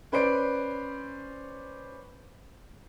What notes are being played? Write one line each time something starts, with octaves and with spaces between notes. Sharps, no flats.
C#4 B4 C5 D5 D7